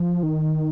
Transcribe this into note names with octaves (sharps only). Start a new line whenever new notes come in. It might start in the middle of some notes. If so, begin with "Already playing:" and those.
Already playing: F3
D#3